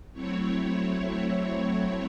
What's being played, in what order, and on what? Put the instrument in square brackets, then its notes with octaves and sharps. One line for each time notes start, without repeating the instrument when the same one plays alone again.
[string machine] F#3 A3 C4 E4 C#5